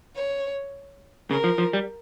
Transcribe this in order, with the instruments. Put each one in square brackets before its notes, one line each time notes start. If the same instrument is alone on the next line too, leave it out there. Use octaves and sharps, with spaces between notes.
[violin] C#5
[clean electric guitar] C#3 [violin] A#4
[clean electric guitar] F3
F3
G3